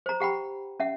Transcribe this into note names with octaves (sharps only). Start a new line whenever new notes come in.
C5 A#5
G4 F#5 G5 B5
C#4 E5 F#5